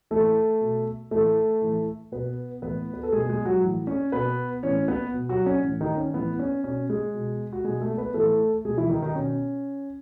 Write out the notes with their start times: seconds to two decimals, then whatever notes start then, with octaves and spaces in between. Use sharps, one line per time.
0.11 A2 E3 A3 A4
0.61 B2
1.11 A2 E3 A3 A4
1.61 A2 E3
2.12 B2 B3 B4
2.62 A2 E3 B3 B4
2.94 B4
3.03 A4
3.12 B2 G#3 G#4
3.29 G#3 G#4
3.45 F#3 F#4
3.62 A2 E3
3.87 C#4 C#5
4.12 B2 B3 B4
4.63 A2 E3 C#4 C#5
4.88 B3 B4
5.14 B2
5.29 F#3 F#4
5.46 C#4
5.64 A2 E3
5.81 D#3 D#4
5.97 C#4
6.13 A2 E3 B3
6.39 C#4
6.64 B2 C#4
6.89 G#3 G#4
7.14 B2
7.53 F#4
7.64 B2 G#3 G#4
7.80 A3 A4
7.98 B3 B4
8.14 A2 E3 A3 A4
8.65 B2 G#3 G#4
8.78 E3 E4
8.89 D#3 D#4
9.02 D#3 D#4
9.14 B2 C#4